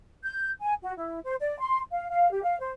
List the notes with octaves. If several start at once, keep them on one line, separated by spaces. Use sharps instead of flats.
G6
G#5
F#4
E4
C5
D5
C6
F5
F5
G4
F5
C5